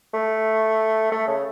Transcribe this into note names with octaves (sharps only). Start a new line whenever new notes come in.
A3
A3
C#3